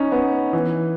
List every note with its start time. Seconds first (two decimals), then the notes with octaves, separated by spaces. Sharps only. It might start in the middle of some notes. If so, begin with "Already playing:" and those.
Already playing: C#4 D#4
0.12 B3
0.53 E3